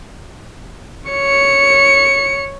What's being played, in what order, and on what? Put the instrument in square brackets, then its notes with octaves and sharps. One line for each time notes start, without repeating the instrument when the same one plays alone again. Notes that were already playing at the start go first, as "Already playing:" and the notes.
[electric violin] C#5 C#7